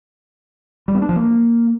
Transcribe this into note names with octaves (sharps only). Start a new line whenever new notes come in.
G3
B3
D4
F3
A#3